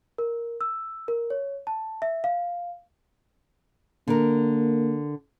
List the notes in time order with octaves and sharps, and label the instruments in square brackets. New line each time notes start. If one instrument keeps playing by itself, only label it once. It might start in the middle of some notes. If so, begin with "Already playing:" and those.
[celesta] A#4
E6
A#4
C#5
A5
E5
F5
[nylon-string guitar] D3 A#4 [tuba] A#3